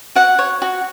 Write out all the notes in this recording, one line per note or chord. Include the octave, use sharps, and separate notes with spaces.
F#4 F#5
C#5
F#4